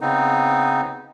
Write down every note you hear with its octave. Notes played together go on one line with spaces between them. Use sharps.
C#3 B3 C4 D#4